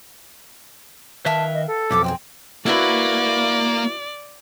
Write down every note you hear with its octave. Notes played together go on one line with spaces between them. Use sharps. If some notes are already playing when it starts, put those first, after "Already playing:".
D#3 B4 E5 F5 G5 A5
D#5
A4
B1 F2 G4 D6 E6
C4 D4 G#4 G5
A#3 E4 F#4 B4 D5